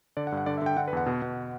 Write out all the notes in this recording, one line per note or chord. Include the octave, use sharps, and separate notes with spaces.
D3 D5
F#5
G2
F#5
D3 D5
E5
D3 G5
D3 F#5
B4
E2 F#5
B2
B2